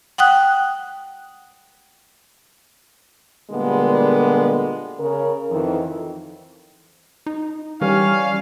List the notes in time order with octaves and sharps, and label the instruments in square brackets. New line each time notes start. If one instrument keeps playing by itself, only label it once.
[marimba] F#5 G5 D#6 F#6
[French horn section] A#2 D3 G3 G#3 A#3 B3
C#3 A#4
F2 D#3 E3
[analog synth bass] D#4
[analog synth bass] E3 [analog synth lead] G3 [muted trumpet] C#4 [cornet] F5